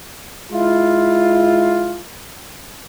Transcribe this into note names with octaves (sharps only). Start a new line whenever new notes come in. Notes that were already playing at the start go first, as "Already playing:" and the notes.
G#3 E4 F4